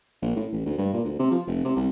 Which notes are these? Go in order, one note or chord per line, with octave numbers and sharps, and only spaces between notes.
A#1
A2
A1
D2
G2
A#2
D2
C3
F3
F1
C3
C2